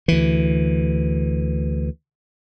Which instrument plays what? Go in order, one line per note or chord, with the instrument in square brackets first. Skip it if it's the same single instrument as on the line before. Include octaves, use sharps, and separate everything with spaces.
[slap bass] D2 E3